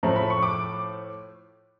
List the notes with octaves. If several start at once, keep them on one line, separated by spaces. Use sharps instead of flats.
A2 F3 A3 A#5
B5
C#6
D6